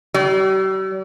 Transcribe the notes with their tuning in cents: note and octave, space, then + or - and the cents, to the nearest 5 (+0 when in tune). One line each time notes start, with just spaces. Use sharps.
G3 -45